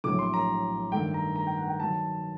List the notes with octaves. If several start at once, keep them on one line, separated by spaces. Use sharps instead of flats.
A#1 A2 F#3 D6
C6
A#5
G2 D#3 A3 G5
A#5
A#5
G5
F#5
G5
D#3 F#3 A5